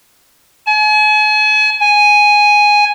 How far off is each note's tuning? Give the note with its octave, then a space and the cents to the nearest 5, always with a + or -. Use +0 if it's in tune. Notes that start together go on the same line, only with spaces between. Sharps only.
G#5 +40
G#5 +0